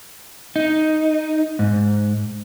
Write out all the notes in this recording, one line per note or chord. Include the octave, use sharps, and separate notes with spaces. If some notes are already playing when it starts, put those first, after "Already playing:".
D#4
G#2